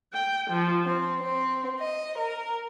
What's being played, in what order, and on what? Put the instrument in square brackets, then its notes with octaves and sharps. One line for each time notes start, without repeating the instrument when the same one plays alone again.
[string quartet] G5
F3
C4
C4
D#5
A#4